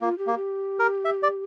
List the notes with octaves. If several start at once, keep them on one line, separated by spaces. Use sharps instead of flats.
A#3 F4
G4
A#3
G4
A#4
E5
D5